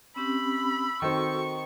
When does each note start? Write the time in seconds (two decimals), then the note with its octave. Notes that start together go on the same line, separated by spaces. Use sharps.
0.16 C4 C#4 G4 B5 E6
1.02 D#3 C4 F#4 A4 C#6